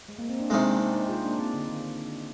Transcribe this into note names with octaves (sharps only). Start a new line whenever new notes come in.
G#3
A#3
C4
D4
C3 D#3 G#3 C4 D#4
A#3 D4
C4 D#4
C4 D#4
F4 G#4
A#3 D4
G#3 C4
D3
D#3